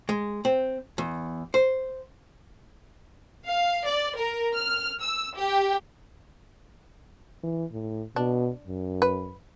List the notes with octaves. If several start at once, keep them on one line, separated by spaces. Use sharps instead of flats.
G#3
C4
E2
C5
F5
D5
A#4
F6
E6
G4
E3
A2
B2 D4
F#2
B4